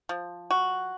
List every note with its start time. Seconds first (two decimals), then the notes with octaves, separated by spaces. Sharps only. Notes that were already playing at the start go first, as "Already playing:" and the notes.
0.09 F3
0.51 F#4